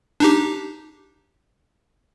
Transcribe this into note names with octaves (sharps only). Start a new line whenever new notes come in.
D4 D#4 G4